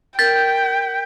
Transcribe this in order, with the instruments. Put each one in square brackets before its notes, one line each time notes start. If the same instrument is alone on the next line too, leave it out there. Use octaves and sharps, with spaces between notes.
[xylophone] A#4 [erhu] G5 [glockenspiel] G6 B6 [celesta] A6